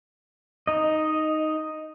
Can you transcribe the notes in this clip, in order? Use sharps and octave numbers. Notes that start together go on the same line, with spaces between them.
D#4 D#5